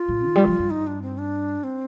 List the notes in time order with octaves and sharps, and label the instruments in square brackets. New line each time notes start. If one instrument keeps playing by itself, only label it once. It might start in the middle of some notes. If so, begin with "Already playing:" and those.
Already playing: [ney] F4
[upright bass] A2
D#3
G3
D#3
F3
G2
[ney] D#4
D4
C4
D4
C4